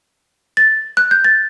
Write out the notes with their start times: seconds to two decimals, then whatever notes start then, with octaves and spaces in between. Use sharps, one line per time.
0.57 A6
0.97 F#6
1.11 G6
1.25 A6